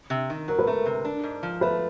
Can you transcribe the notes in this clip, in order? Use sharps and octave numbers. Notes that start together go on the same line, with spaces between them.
C3
D#3
F#3 A#4
B4
A3 A#4
C3
D4
G#2
F3
A3 B4